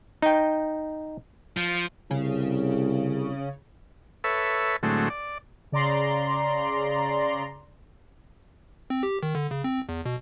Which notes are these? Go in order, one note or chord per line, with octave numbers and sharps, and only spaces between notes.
D#4 G5
F3
C2 C#3
A4 B4 C#5 E5
A2 D3 F#3 G#3 A3 C4
D5
C#3 D5 A#5 C6
C4
G4
D#3
D3
C#3
C4
E2
B2